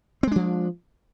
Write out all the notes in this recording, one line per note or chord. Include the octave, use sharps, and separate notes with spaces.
F3 G#3 C4 D4